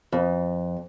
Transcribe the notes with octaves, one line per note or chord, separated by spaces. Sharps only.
F2